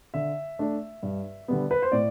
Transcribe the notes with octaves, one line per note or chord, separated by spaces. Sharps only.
D3 E5
A3 D4
G2
D3 G3 B3
B4
C5
A2 D5